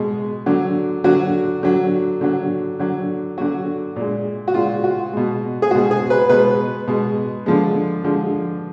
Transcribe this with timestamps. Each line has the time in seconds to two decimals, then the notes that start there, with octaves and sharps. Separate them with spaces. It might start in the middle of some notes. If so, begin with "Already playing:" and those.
Already playing: B2 G#3
0.46 D3 F#3
1.04 D3 F#3 F#4
1.63 D3 F#3
2.21 D3 F#3
2.79 D3 F#3
3.38 D3 F#3 F#4
3.96 A#2 G#3
4.48 F#4
4.54 A#2 G#3 F4
4.84 F#4
5.13 B2 G#3
5.62 G#4
5.71 B2 G#3 F#4
5.91 G#4
6.10 B4
6.29 B2 G#3 B4
6.87 B2 G#3
7.46 D3 F3 G#3
8.04 D3 F3 G#3